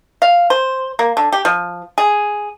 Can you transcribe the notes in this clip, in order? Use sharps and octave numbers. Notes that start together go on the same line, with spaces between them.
F5
C5
A#3
D3
G4
F3
G#4